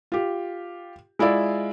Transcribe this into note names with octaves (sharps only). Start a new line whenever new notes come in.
F4 G4
G#3 E4 F4 D5 E5